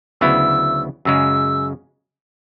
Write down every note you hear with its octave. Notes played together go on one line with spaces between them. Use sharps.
D2 C#3 F#3 B3 E4 E6
F#2 C#3 G#3 E6